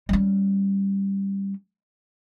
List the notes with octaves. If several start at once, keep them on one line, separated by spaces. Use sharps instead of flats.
G3 C#4